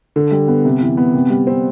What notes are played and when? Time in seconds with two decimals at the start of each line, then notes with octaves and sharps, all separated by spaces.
0.16 D3
0.31 G3
0.48 B3
0.65 C3
0.81 E3
0.97 B3
1.14 C3
1.30 G3
1.47 C4